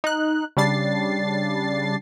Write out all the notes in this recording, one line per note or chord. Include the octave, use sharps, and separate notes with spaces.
D#4 F#6
C#3 G3 D4 A6 C7